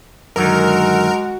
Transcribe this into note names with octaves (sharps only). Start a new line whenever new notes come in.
F#2 D3 D#3 G#3 F#4 A#4